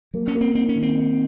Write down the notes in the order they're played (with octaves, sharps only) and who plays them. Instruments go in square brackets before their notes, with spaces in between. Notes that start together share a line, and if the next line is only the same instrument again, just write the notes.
[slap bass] F#3 [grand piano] A#3
[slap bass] C#4
[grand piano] A#3
[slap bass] C4
[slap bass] C4 [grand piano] D#4
[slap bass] C#4
[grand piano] D#3
[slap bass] C4
[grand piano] D#4